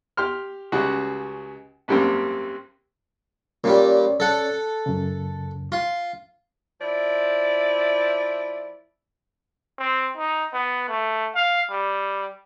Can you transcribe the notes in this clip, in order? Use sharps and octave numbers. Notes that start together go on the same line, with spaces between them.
G4 C6 F6
C#2 C#3 G3 F#4
G#1 F#2 G3 A#3 C4
A#2 G3 C#4 C#5 D5
A4 F#5
F#2 C#3
F4
F3 E4 D5
C4
D#4
B3
A3
F5
G3